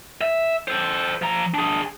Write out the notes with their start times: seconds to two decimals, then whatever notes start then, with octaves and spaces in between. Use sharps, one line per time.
0.21 E5
0.68 A4 C5
1.22 F3 A#5
1.54 D4 G#4